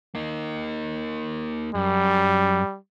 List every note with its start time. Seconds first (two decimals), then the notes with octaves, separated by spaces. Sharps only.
0.15 A#3 D#4
1.75 F#2 G3